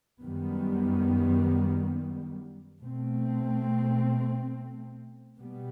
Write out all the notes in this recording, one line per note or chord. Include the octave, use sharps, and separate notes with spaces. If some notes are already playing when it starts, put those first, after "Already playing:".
F#2 D#3 G3 B3
B2 A3 C4
B2 G3 B3